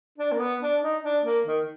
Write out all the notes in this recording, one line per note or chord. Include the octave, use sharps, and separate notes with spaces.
D4
A#3
B3
D4
D#4
D4
A#3
D#3